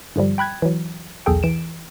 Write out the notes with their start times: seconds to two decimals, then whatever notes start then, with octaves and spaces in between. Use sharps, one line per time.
0.16 G2 D3 F3 G3
0.38 G5 B5 F#6 G#6
0.62 E3 F#3
1.26 B1 E2 G#4 A4 G5
1.43 E3 D7 E7